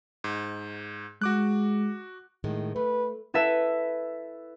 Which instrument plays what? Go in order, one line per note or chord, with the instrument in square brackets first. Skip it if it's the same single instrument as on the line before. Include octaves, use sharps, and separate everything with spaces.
[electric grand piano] G#2
[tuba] G#3 [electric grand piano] F#4 D6 F#6
[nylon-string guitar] A2 D#3 G#3
[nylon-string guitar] A3 [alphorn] B4
[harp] E4 A4 B4 E5 A5